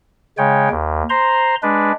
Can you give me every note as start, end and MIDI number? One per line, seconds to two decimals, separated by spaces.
0.38 0.69 49
0.38 0.69 56
0.38 0.69 73
0.38 0.69 79
0.71 1.03 39
1.10 1.55 72
1.10 1.55 82
1.10 1.55 84
1.63 1.92 56
1.63 1.92 62
1.63 1.92 71